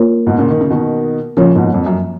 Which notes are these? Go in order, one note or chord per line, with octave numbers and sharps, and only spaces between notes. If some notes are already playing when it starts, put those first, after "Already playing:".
Already playing: A#3 F4 A#4 C#5
G#2 B2
A#2 C#3
D#3
C#3
B2 D#3
A#2 C#3 F3 A#3 F4 A#4 C#5
G#2 B2
F2
F#2